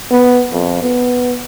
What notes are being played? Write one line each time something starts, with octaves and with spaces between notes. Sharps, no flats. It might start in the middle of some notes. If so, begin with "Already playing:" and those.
B3
F2
B3